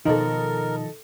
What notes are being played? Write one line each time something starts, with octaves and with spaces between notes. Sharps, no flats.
B2 D#3 F3 D#4 A4 A#4 D#5